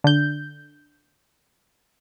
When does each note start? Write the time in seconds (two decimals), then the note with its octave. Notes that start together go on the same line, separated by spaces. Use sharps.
0.04 D3 G6